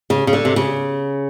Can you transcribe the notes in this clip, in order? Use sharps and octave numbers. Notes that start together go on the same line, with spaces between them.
C#3
C#3
D3
C3
C#3